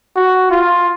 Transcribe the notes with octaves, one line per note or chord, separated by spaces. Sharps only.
F#4
F4